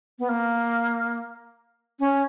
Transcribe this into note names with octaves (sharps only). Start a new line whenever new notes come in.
B3
A#3
C#4